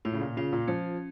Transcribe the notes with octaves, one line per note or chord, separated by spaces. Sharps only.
A2 F4
C#3
A#2
C#3 F4
A#2
F3 C#4